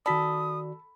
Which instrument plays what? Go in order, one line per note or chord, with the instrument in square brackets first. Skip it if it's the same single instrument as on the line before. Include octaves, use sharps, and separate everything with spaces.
[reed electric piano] D#3 F#4 D5 [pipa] A4 [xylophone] B5 B6 [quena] D#6